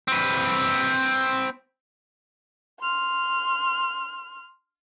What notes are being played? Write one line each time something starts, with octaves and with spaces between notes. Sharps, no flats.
C4 B4
C6 F6